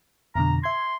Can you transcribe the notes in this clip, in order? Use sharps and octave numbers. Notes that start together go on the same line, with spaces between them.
F2 B2 D3 A#5
E5 C6 G#6